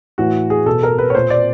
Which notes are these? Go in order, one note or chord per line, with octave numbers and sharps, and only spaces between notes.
A2 E3 F#4
G#4
B2 A4
A#4
B4
C#5
A#2 C5
D5